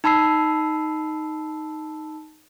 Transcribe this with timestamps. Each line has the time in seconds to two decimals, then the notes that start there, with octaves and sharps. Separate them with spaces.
0.04 D#4 A5 B5 E6 C7